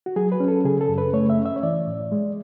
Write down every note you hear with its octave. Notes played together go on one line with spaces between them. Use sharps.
F#4
F#3 G#4
B4
C#4
A4
C#3 G#4
A4
F#2
B4
A3 C#5
E5
C#4
E5
C#5
E3 D5
A2
G#3